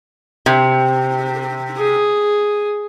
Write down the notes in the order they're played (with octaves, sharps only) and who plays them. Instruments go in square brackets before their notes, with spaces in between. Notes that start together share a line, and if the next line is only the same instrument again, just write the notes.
[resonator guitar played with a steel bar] C3
[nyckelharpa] G#4